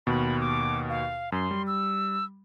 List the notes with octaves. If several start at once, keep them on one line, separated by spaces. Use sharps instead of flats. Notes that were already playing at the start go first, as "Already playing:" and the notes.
D#2 B2 B5
D6
F5
F#2 C6
G3
E6